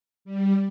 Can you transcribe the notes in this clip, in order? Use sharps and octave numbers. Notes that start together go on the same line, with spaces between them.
G3